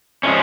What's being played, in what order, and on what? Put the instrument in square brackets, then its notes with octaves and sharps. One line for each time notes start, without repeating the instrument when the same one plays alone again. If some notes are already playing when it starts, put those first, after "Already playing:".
[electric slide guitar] D3 F3 G#3 C#4